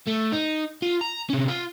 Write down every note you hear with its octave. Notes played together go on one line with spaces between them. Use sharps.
A3
D#4
F4
A#5
C3 C#4
F4